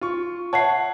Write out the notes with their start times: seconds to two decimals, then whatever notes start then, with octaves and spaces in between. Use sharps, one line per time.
0.01 F4 C#6
0.53 C#5 E5 F#5 A5 C7